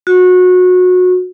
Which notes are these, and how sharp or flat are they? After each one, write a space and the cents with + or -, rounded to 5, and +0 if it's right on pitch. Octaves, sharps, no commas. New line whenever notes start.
F#4 -25